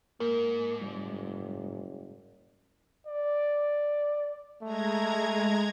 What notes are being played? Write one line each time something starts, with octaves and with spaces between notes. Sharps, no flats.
G#2 A#3 A#4
F#1 G3
D5
G#3 A3 A#5 G#6